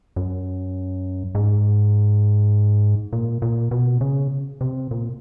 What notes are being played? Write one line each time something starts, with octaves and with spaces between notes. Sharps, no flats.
F#2
G#2
A#2
A#2
B2
C#3
C3
A#2